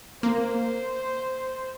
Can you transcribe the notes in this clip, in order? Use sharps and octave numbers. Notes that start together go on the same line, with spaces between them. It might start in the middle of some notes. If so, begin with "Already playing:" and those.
A#3 C5